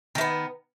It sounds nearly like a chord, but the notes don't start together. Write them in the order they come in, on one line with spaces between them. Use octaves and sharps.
D#3 A3 B3